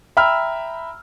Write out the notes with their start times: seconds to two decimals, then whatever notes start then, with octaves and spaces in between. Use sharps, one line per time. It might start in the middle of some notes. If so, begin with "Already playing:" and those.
0.17 E5 G5 A#5 B5 E6 F6